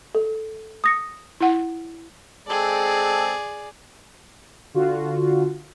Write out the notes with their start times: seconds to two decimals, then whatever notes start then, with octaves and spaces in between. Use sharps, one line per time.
0.15 A4
0.84 D#6 A#6 C#7
1.41 E4 F#5
2.47 G#3 C4 G#4 A4 D5
4.74 D3 F4 F#4